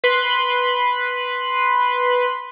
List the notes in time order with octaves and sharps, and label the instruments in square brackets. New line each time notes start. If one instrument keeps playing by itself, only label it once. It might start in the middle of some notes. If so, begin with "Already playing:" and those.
[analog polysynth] B4 B5 C6